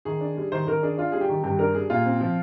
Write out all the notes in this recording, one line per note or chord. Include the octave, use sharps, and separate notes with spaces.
D#3 G#4
D4
G3
D#3 C5
D#3 A#4
D4 G#4
D4 F4
G3 G#4
G4
D#3
G2 G4
D4 A#4
G3 G#4
A#2 F4
C4
F3